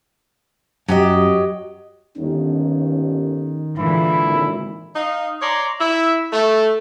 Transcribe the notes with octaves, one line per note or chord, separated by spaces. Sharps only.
F#2 F#3 G4 D#5
G1 D#2 D#3 C#4
A#2 D3 E3 G#3 E4
G#1
D#4 D#5 F5
C#5 D5 A#5 C6
E4 E5
A3